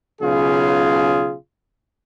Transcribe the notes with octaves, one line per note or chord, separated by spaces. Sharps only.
B1 C#3 F4 G#4